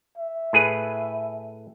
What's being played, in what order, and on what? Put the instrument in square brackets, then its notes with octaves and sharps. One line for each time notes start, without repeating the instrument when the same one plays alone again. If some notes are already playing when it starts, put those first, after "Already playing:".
[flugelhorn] E5
[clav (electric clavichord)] A2 G#4 B4